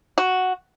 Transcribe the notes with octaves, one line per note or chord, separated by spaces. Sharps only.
F#4